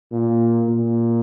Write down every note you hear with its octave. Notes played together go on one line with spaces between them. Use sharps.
A#2
A#2